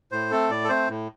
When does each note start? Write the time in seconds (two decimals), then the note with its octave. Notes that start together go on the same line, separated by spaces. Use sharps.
0.12 A2 C5
0.31 A3 C4 A4
0.50 A2 D5
0.64 A4
0.69 A3 C4 C5
0.89 A2